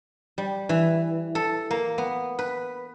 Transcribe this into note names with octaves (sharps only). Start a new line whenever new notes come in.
G3
E3
A4
A#3
B3
B4